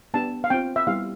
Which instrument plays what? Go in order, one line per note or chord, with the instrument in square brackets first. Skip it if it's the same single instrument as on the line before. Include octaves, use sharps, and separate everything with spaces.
[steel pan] B3 D4 G4 A5
F5
C4 F4 G5
E5
G3 B3 E4 G4 F5